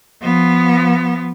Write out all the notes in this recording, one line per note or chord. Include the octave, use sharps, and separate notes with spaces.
F3 B3